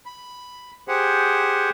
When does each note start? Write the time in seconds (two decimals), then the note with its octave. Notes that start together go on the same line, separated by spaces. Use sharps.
0.06 B5
0.88 G4 G#4 C5 F#5